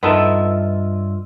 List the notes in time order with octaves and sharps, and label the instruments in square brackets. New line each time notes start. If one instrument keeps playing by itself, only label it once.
[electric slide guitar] G2 F4 E5 [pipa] B3 D#4 A4